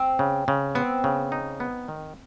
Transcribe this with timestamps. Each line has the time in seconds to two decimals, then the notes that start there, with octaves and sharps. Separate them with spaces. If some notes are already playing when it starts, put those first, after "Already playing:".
Already playing: C4
0.19 C#3
0.48 C#3
0.75 B3 C4
1.04 C#3
1.32 D#4
1.60 B3
1.88 D#3